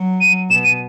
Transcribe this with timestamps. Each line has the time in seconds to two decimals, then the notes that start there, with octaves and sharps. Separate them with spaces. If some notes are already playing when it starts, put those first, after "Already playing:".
Already playing: F#3
0.21 D#7
0.50 B2 E7
0.64 D#7